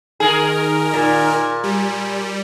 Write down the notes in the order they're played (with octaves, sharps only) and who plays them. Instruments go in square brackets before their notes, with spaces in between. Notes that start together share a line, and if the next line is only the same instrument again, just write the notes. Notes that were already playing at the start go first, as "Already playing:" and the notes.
[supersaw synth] D#3 A#4 [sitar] G#4
[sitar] A#2
[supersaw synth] G3